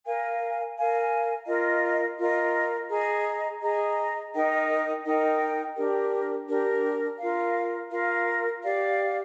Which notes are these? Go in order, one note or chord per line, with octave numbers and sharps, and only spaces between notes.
A#4 F5 G#5
A#4 F5 G#5
F4 A#4 D#5
F4 A#4 D#5
G#4 D#5 A#5
G#4 D#5 A#5
D#4 A#4 D#5 G5
D#4 A#4 D#5 G5
D4 G4 A#4
D4 G4 A#4
F4 A#4 F5
F4 A#4 F5
G4 D5 F5